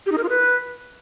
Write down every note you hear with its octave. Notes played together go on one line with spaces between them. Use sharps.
G4
D#4
A#4
F4
B4